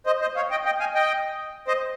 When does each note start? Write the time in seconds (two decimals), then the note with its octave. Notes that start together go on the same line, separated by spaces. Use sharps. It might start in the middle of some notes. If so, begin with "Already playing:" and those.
0.06 C5 D#5
0.21 C5 D#5
0.36 C#5 F5
0.51 D#5 G5
0.65 D#5 G5
0.80 F5 G#5
0.95 D#5 G5
1.68 C5 D#5